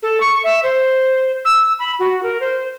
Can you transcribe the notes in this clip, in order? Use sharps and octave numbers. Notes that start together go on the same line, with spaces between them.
A4
C#6
E5
C5
E6
B5
F#4
A#4
C5